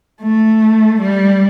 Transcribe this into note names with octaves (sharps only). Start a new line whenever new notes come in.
A3
G3